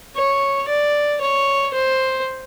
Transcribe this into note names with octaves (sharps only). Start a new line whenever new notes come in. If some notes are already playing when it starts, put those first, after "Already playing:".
C#5
D5
C#5
C5